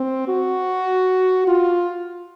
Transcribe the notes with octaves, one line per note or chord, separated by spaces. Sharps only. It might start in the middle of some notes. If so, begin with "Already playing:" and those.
Already playing: C4
F#4
F4